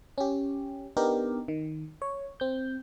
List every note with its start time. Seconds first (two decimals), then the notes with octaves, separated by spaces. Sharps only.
0.18 C#4 G4
0.97 B3 D4 D#4 G4 A#4
1.48 D#3
2.02 C#5
2.40 C4 G6